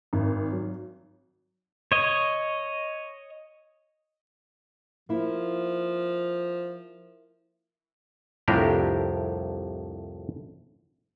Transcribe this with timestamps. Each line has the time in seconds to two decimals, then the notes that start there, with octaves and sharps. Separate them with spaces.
0.13 G#1
0.52 F#3
1.92 C#5 D#5
5.09 F3 A#3 E4
8.48 C2 F2 A2 D4 G4 A#4